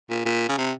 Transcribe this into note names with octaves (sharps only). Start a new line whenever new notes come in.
A#2
A#2
C#3
C3